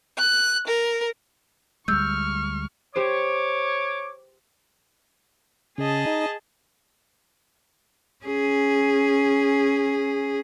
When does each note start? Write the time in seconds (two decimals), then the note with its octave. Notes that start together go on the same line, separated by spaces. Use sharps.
0.18 F#6
0.67 A#4
1.88 D2 G3 G#3 C#6 E6 F6 G6
2.96 G4 C5 C#5 D6
5.78 C#3 G#4 D#5 A5
6.06 D#4
8.25 C#4 G#4